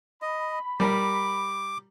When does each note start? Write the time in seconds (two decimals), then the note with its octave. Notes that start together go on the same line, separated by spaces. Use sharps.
0.22 D#5 B5
0.80 G3 A#4 A#5 D6